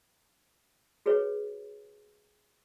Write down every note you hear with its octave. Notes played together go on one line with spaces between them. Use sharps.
F#4 G#4 B4 C#5